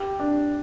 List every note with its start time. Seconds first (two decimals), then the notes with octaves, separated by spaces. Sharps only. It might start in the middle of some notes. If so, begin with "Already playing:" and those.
Already playing: G4
0.20 D4